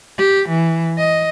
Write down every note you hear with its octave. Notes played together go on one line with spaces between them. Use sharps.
G4
E3
D#5